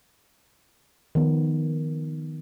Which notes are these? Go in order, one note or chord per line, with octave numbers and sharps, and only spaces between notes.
D#3 F3 B3